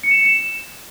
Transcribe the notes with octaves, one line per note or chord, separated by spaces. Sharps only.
C#7
E7
C#7
E7